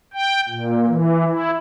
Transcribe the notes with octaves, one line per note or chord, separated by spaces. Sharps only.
G5
A#2
E3
E4